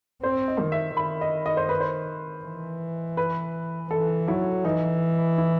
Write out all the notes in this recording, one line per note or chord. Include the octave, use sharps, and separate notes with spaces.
C4 C5
D#5
D#3
E5
D#3 B5
D#5
D#5
C5
B4
C5
E3
B4
E3 A4
F#3 E4
E3 D#4
E4